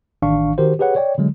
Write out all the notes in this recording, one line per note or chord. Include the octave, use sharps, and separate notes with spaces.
A1 D#3 D4 F5 C#6
D#3 F#4 G4 A#4 C5
G4 G#4 B4 C#5 F#5
C#5 D5 G5
D3 F#3 G#3